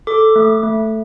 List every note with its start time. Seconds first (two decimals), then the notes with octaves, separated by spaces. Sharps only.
0.07 A4 D6
0.36 A3
0.63 A3